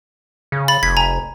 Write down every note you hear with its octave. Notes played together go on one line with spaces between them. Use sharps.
C#3
B5 A6 F#7
F1 G#6 B6
G#5 A#5